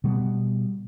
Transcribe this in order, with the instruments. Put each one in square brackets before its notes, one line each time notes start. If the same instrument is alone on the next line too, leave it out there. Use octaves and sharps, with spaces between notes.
[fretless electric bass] B2 G3 G#3 B3